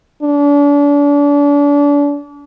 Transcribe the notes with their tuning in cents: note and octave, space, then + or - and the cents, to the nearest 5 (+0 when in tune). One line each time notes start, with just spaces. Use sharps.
D4 -35